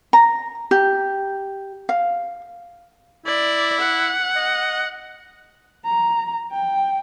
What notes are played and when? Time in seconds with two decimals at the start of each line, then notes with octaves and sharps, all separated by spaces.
0.13 A#5
0.71 G4
1.89 F5
3.26 E4 D5
3.80 F#5
4.36 D#5
5.85 A#5
6.52 G5